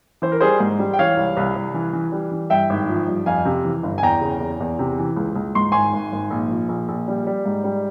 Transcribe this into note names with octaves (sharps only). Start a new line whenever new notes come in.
E3 C5
A#4
G3 G#4 C5
G#2
G3
G5
E3 C#5 F5
C2
C2
C2
E3
E3
G3
E3
G2 E5 G5
G#1
F3
G2
F2 F5 G#5
C3
E3
G1
G#5
E2 G5 A#5
C#3
E2
E2
C3
E3
C#2
C#2
G#2 C6
G#1 G#5 C6
G#1
G#1
A#1
F3
A#1
A#1
G3
G3
G#2
G3